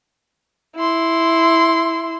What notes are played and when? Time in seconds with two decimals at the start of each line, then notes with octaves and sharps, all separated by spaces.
0.76 E4 C6